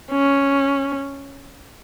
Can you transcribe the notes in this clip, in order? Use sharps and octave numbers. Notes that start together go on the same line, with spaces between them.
C#4